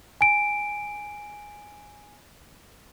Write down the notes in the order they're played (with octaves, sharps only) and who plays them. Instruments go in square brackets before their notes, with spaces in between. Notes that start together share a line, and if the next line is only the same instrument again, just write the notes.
[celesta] G#5 D7